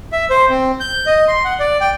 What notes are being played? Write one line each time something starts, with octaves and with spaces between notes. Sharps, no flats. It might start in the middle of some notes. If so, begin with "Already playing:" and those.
E5
C5
C4
G6
D#5
C6
F#5
D5
G5